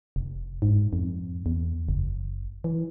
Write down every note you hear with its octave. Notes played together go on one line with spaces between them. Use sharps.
F1
G#2
F2
E2
F#1
E3